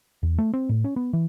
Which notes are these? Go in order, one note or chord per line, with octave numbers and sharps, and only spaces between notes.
E2
A3
C4
A2
C#4
B3
E3